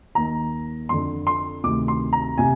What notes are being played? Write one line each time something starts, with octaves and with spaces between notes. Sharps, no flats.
D#2 D#3 A#5
F2 D3 C6
C6
D2 C3 D#3 D6
C6
A#5
C3 G#5